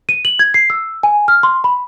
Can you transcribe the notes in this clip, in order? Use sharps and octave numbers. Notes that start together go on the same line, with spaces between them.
D#7
F#7
G#6
C7
E6
G#5
F6
C6
B5